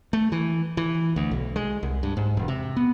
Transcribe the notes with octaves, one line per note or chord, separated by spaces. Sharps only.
A3
E3
E3
D2
B1
G#3
C2
G2
G#2
E1
C3
B3